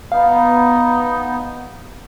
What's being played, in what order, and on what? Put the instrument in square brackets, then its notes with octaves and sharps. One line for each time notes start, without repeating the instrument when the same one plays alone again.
[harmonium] B3 [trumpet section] D#4 [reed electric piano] F5